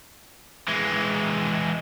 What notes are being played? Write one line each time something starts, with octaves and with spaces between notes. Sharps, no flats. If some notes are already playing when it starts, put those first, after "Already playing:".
E3 G#3